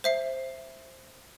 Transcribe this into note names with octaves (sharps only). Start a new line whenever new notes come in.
C5 E5 C7